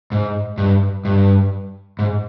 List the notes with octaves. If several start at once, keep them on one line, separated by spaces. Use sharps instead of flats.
G#2
G2
G2
G#2